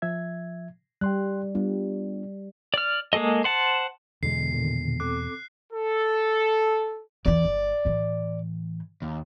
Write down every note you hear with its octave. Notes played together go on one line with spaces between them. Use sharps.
F3 E5 G#6
G3 G5 C6 F#6
G3 B3 D4 F4
D5 F6
G#3 A#3 G#4 A4 D#5
C5 F#5 A5
E2 B2 D3 G#3 C7
A#2 D3 D#3
C4 A4 D6 F#6
A4
E2 E3 D5
G1
A2 E3
D#2